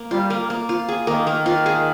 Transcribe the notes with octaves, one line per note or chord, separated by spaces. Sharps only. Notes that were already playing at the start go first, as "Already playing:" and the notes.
Already playing: A#3
G3 F4
A#3
A#3
F4
G#4
D#3 A#3
A#3
F4
G#4